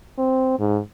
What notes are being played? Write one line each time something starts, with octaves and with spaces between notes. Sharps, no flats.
C4
G#2